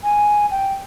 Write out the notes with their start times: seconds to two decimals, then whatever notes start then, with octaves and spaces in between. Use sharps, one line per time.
0.03 G#5
0.51 G5